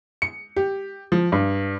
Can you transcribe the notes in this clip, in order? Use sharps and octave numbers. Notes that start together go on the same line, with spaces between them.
C#7
G4
F3
G2